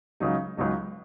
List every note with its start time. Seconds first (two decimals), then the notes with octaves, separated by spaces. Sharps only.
0.20 C#2 C#3 F#3 D#4
0.57 C#2 C#3 F#3 D#4